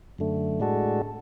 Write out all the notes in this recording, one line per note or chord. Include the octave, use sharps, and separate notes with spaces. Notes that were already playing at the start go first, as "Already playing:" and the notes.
F#2 D3 A3
A2 G#3 D4 F#4 A4